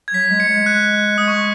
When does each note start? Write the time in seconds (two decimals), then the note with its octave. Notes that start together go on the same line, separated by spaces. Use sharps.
0.08 G#6
0.13 F#3 B6
0.30 G#3
0.40 C#7
0.49 G#3
0.66 F#6
1.18 G#3 D#6
1.28 C#6